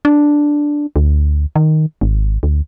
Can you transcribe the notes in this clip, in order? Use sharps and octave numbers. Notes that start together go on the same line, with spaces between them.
D4
D2
D#3
G#1
D2